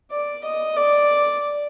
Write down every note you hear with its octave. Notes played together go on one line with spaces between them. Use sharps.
D5
D#5
D5